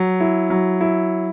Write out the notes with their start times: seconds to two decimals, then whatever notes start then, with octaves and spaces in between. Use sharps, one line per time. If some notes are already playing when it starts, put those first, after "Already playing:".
Already playing: F#3
0.20 E4
0.50 F#3
0.81 E4